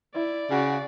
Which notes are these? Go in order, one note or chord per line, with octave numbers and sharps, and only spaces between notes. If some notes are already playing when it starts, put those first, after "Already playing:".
E4 D5
C#3 F#4